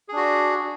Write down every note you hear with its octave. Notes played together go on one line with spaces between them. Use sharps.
D4 F#4 G#4